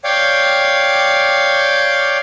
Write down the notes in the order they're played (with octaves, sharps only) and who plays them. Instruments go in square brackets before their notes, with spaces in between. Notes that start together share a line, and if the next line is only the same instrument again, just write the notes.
[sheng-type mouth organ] C#5 D5 F5 G5